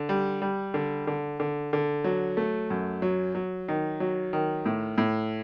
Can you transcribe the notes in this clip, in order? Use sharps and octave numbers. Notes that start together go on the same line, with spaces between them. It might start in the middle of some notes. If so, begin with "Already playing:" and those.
Already playing: D3
G3
G3
D3
D3
D3
D3
F#3
A3
F#2
F#3
F#3
D#3
F#3
D#3
A2
A2